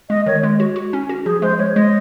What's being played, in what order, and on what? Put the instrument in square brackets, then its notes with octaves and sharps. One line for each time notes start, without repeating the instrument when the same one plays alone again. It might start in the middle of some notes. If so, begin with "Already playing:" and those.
[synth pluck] G#3 [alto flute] D#5
[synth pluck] D#3 [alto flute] C#5
[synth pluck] G#3
F#4
F#4
C#4
F#4
[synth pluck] F3 [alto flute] G#4
[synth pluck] G#3 [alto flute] C5
[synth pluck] G#3 [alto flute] C#5
[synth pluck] G#3 [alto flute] D#5